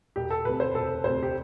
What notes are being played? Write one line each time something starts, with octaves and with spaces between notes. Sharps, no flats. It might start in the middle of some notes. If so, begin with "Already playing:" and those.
E1 G4
A4
D2 C3 B4
C5
E1 A4
D2 C3 C5
G4